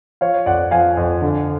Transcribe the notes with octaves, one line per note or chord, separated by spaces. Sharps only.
F3 C#5 F5
F2 D5 F#5
F3 F5 G#5
F2
D3